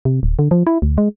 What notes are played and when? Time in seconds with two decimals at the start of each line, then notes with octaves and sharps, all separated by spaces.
0.05 C3
0.23 D1
0.39 D3
0.51 F3
0.67 E4
0.82 D2
0.98 G#3